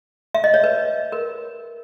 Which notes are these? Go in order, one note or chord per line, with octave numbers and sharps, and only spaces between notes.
E5
D#5
C#5
B4
A#4